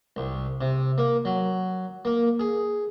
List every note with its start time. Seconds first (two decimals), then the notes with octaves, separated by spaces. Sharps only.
0.16 C2
0.61 C3
0.98 A#3
1.25 F#3
2.05 A#3
2.39 G#4